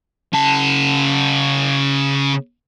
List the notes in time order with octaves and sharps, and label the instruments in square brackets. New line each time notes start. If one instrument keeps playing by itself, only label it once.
[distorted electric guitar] C#3 A5